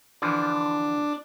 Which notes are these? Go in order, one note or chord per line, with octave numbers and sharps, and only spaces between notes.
D3 E3 F3 D4